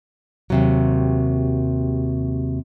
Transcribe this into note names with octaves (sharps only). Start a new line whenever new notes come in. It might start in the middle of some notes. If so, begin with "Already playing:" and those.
D#2 C3 F#3